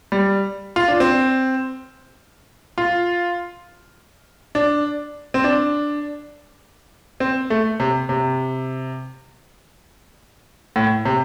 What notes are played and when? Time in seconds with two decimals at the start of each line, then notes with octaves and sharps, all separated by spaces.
0.12 G3
0.76 F4
0.88 D4
1.00 C4
2.78 F4
4.55 D4
5.34 C4
5.44 D4
7.20 C4
7.50 A3
7.80 C3
8.09 C3
10.76 A2
11.05 C3